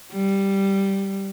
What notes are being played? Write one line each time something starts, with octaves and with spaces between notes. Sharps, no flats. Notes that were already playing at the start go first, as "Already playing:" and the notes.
G3